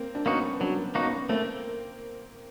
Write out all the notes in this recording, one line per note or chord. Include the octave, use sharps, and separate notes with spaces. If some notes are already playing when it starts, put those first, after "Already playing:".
Already playing: A#3 C4
D4
A#3 B3 C#4 D#4 F#4
F#3 C4 D4
A#3 B3 C#4 D#4 F#4
A3 A#3 C4